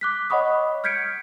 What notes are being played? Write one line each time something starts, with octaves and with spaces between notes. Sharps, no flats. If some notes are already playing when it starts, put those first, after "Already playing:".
D6 F#6 B6
C#5 D#5 F#5 B5 C#6 D#6
F6 G6 G#6 B6 C#7 D7